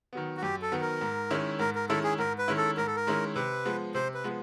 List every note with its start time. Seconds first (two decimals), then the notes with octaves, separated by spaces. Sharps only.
0.13 D#3 F#3 B3
0.37 F#4
0.42 F#2 G4
0.62 A4
0.72 D#3 F#3 B3
0.81 A#4
1.01 G#2
1.30 D#3 G#3 C#4 E4
1.59 G#2 A#4
1.75 A#4
1.89 D#3 G#3 C#4 E4 A4
2.04 G#4
2.18 G#2 A#4
2.38 B4
2.48 D#3 G#3 C#4 E4
2.57 A4
2.77 G#2 A#4
2.87 A4
2.96 A#4
3.07 D#3 G#3 C#4 E4
3.35 C3 B4
3.65 F3 G#3 B3
3.94 C3 C5
4.14 B4
4.24 F3 G#3 B3